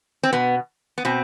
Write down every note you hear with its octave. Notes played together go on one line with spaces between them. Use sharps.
C4
B2 B3
B3
B2 C4